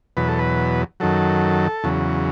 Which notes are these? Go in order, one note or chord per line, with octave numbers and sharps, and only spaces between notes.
E2 B2 F#3 B4
A4
B4
F#2 D#3 F#3 A4
E2 C#3 F#3